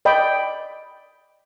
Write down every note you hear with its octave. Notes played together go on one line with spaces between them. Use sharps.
D5 D#5 G5 B5